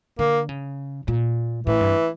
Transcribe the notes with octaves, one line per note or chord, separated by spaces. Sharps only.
D3 A#3
C#3
A#2
A2 E3
G2